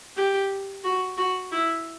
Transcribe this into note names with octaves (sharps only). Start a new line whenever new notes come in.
G4
F#4
F#4
E4